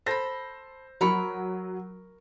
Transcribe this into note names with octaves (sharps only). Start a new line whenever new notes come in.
A4 C5 B5 A#6
F#3 A#4 B5 C#6